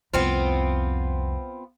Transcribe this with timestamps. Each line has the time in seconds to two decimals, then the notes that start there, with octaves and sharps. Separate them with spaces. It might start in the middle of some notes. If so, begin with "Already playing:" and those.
0.14 C2 F2 B3 C4 F4